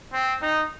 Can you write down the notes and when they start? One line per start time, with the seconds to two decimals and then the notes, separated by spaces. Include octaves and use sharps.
0.13 C4
0.42 D#4